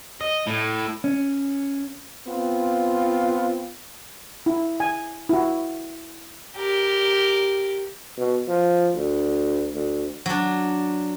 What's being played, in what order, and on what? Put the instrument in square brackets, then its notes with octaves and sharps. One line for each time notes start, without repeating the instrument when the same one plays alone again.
[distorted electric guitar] D#5
A2
[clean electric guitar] C#4
[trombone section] B3 C4 F4
[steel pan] E4
G#5
E4 F#4
[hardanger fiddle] G4 A#4
[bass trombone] B2
F3
D2
D2
[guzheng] F#3 D4